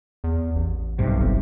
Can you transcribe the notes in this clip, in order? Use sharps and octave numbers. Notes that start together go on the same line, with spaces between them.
E2
A1
B1 G2 C3
G1